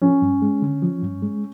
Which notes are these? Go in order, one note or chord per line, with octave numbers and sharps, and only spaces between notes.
F3 C#4
G2
G#3
D3
F3
G2
G#3